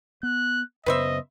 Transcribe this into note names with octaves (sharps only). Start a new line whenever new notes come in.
B3 F#6
F#2 C#3 B3 B4 C5 D#5 E5